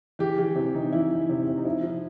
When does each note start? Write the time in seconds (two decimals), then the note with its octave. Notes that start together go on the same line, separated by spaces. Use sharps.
0.19 E3 G4
0.38 E3 G4
0.55 C3
0.74 C3 D#4
0.93 E3 E4
1.11 E3
1.29 C3
1.47 C3
1.58 D#4
1.65 F3 E4
1.83 F3